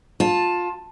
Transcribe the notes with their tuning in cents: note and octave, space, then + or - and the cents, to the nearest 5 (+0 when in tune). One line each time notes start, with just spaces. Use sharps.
F4 +20 A5 +0